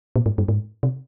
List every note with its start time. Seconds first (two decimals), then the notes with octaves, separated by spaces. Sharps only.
0.16 A#2
0.26 G#2
0.38 G2
0.49 G#2
0.83 C3